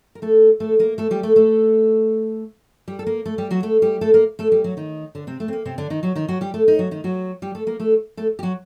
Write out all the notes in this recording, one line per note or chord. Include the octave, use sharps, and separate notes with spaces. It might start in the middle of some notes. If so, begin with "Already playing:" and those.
A#4
A3 A4
A3 A4
A#3 A#4
A3 A4
G3 G4
A3 A4
A3 A4
G3 G4
A4
A#3 A#4
A3 A4
G3 G4
F#3 F#4
A3 A4
G3 G4
A3 A4
A#3 A#4
A3 A4
G3 G4
F#3 F#4
D#3 D#4
D3 D4
C3 C4
A3
C4
A#3
C3 C4
D3 D4
D#3 D#4
F#3 F#4
D#3 D#4
F#3 F#4
G3 G4
A3 A4
D#4
F#3 F#4
D#3 D#4
F#3 F#4
G3 G4
A3 A4
A#3 A#4
A3 A4
A3 A4
G4
F#3 F#4